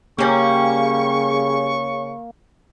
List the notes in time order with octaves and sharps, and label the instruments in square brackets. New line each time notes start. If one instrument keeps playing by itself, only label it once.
[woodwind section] C#3 [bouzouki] G3 C#4 [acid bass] A#3 [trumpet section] C#6